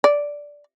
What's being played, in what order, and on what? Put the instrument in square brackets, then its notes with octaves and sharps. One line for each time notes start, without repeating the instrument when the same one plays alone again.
[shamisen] D5